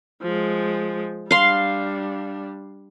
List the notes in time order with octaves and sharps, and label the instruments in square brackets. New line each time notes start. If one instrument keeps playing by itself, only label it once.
[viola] F3 G#3
[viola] G3 D4 [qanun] F5 C6